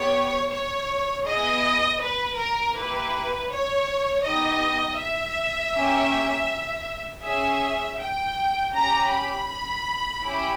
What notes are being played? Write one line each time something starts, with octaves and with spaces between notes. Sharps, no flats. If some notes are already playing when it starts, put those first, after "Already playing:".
Already playing: B3 G4 C#5
C#5
B3 E4 G#4 D#5
B4
A#4
A#3 E4 G4 B4
C#5
B3 D#4 G4 D#5
E5
A#3 C#4 G4
C#4 G#4 E5
G5
C#4 G4 A#5
B5
C#4 E4 G4